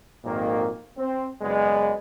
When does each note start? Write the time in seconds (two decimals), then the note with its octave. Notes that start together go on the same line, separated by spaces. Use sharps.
0.24 G#1 F2 A#2 D#3 A#3
0.97 C4
1.42 F#1 G#3 B3 D5